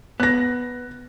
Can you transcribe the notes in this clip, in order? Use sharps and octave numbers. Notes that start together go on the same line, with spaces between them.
B3 F#6 A#6